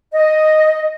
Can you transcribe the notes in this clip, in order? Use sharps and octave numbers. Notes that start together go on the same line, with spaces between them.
D#5